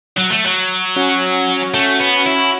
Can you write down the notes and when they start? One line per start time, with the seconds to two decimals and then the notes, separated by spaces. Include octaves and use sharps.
0.18 F#3
0.31 A3
0.45 F#3
0.96 C#4 F#4
1.74 A3
2.00 B3
2.26 E4